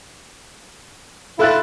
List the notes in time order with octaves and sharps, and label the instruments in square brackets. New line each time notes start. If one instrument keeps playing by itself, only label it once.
[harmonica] E4 F4 [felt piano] A4 F#6 A6